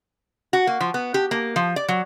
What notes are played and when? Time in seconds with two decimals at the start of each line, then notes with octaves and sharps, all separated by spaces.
0.53 F#4
0.67 A#3
0.81 F3
0.94 B3
1.14 G4
1.31 A#3
1.56 F3
1.76 D5
1.88 F#3